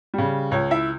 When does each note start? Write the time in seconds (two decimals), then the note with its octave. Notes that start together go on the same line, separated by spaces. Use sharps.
0.14 C#3 G3
0.51 C#2 C#5
0.71 E4 E5